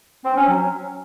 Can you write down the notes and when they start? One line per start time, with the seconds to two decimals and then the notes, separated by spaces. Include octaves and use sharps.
0.24 C4
0.36 C#4
0.48 F#3